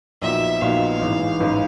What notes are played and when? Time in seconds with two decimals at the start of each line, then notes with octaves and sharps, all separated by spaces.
0.22 A#1 A#2 F#3 B3 D#4 E5
0.61 A#1 A#2 F#3 B3 D#4 F5
1.01 A1 G#2 E3
1.40 A1 G#2 E3